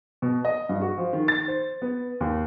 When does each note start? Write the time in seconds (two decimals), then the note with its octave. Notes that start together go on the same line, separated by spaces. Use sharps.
0.22 B2
0.45 D#5
0.69 G2
0.82 F#4
0.98 F3
1.13 D#3
1.28 A6
1.48 C5
1.82 B3
2.21 D#2